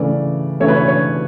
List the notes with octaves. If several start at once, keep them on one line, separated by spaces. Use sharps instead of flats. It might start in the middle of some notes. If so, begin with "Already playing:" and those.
Already playing: C#3 E3 A3 D5
C#3 E3 A3 C#5
B4
C#5
C#5